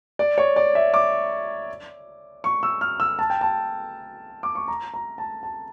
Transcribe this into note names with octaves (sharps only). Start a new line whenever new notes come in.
D5
C#5
D5
E5
D6
C#6
E6
F6
E6
A5
G5
A5
D6
C#6
A#5
A#5
A5
A5